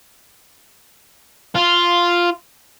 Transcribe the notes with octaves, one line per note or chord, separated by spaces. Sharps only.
F4